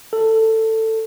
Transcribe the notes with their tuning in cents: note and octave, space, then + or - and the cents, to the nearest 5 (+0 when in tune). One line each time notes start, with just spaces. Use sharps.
A4 +15